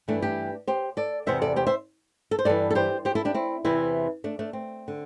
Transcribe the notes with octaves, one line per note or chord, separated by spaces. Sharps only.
G2 E3 A3 D4
D4 G4
G4 C5
A4 D5
E2 C3 E3 C5 E5
A4 D5
G4 C5
C5 E5
A4
C5
G2 E3 A4 D5
A4
G4 C5
G4 C5
E4 A4
D4 G4
C4 E4
E2 C3 E3 C4 E4
A3 D4
A3 D4
C4
D3